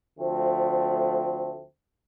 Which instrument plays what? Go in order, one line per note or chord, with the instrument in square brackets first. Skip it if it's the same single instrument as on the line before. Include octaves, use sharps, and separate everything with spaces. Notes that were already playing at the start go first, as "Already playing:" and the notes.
[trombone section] D2 F3 A3 C4